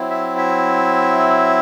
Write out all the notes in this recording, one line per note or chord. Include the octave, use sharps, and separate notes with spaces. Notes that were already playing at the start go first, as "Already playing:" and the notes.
Already playing: F#3 C4 E4
E5
E5